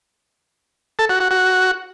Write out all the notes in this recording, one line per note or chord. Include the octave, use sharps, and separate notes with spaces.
A4
F#4
F#4
F#4